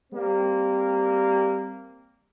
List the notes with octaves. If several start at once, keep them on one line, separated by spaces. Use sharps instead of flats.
G3 A#3 C4